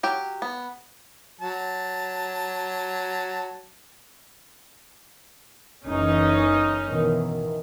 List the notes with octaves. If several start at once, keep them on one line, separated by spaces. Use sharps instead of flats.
F#3 G4
B3
F#3 A5
F#1 E3 C#4 D#4
B2 D#3 E3